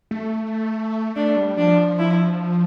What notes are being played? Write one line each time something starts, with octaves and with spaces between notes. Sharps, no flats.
A3
A3 D4
G3
F3 D4
E4